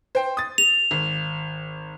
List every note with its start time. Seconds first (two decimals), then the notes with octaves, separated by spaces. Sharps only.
0.15 C5 G5
0.37 D#6 A6
0.58 F7
0.91 G#1